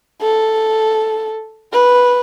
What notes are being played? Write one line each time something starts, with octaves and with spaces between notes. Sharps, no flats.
A4
B4